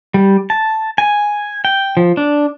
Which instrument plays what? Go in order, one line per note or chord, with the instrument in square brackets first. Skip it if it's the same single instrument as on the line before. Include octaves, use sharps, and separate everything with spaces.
[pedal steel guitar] G3
A5
G#5
G5
F3
D4